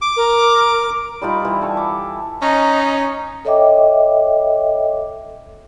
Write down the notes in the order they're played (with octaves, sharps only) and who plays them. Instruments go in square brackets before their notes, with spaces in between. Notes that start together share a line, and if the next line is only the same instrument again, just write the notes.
[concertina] D6
[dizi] A#4
[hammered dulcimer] G3 D#4 F4 B5
E3 G3
A4 G5 C#6
D6
[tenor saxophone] C#4 [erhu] D#4
[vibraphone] A4 C#5 D#5 E5 G5 D6